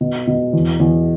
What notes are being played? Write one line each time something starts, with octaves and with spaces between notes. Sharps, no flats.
B2
B2
E2
E2